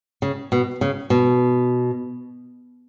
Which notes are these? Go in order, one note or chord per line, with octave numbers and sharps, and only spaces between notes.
C#3
B2
C#3
B2